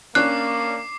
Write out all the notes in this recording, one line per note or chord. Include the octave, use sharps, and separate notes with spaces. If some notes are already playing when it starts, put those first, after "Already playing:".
A#3 C#4 D4 D6 F#6 C7